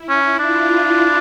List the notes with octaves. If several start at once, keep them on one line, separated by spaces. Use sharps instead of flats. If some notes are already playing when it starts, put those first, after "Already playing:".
Already playing: E4
C#4
D4 F4
E4